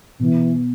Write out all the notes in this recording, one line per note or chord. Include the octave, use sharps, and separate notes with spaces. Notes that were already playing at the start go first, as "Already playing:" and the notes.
B2 E3